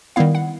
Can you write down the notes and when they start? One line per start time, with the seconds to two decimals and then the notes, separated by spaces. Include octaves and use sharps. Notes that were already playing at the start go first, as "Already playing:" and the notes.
0.16 D#3 G3 B3 E4 F5
0.35 F#5